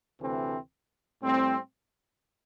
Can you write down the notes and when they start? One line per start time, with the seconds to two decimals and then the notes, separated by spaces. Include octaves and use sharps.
0.21 D2 C3 E3 A3 C4
1.22 A2 G3 C4